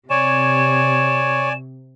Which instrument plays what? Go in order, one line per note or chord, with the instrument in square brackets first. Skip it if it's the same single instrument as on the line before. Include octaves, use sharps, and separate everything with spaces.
[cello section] C3 [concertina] C#5 [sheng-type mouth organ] D5 G#5 [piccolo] E7